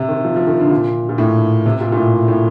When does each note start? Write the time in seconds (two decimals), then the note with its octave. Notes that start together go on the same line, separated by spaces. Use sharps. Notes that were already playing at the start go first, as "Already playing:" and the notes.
Already playing: C3
0.09 D#3
0.25 F3
0.36 F3
0.47 D#3
0.60 D3
0.71 A#2
1.09 A#2
1.18 A2
1.66 C3
1.81 A#2
1.92 A#2
1.96 A2
2.28 A2